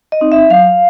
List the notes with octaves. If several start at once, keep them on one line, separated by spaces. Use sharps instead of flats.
D#5
C4 D#4
E5
F#3 F5